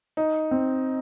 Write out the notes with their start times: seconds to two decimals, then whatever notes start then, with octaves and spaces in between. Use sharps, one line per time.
0.17 D#4
0.51 C4